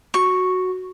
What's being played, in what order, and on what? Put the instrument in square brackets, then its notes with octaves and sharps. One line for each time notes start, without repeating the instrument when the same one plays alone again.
[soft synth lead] F#4 [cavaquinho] C#6